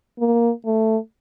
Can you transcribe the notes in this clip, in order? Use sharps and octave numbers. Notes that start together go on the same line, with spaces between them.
A#3
A3